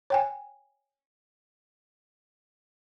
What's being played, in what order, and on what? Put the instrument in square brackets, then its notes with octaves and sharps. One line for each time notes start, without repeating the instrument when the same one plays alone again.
[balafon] C#5 G5 G#5